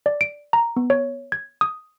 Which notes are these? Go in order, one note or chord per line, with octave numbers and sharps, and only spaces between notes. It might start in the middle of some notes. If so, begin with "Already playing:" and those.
D5
D7
A#5
B3
C#5
G#6
D#6